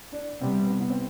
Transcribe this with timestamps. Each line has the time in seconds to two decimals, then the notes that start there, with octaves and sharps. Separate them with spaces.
0.12 D4
0.41 C3 G3 B3 C4
0.70 B3
0.80 B3
0.90 C4